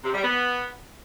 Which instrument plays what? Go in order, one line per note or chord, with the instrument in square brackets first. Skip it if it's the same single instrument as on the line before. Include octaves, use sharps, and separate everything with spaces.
[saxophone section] C3
G3
B3